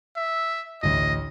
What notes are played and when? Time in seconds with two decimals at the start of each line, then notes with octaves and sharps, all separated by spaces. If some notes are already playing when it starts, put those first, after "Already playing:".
0.17 E5
0.83 A1 D2 D#5